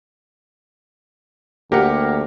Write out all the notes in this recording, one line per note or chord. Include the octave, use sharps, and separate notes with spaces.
D2 A#3 G4 A#4 F#5